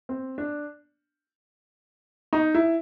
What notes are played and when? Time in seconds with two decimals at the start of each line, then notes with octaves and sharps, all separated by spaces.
0.09 C4
0.38 D4
2.33 D#4
2.55 E4